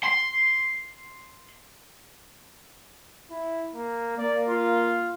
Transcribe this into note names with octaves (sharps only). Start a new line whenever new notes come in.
C6
E4
A#3
A#3 D5
F4